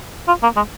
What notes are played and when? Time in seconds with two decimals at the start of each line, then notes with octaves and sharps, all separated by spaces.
0.28 F4
0.43 A#3
0.56 G#3